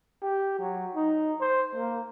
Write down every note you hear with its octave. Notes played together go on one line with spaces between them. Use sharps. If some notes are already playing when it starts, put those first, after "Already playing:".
G4
F#3
D#4
C5
A#3